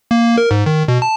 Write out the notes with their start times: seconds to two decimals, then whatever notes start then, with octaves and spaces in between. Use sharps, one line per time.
0.11 A#3
0.38 A#4
0.51 G#2
0.66 D#3
0.88 B2
1.02 A5